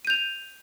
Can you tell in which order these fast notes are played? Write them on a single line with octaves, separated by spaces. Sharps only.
D#7 G6 F7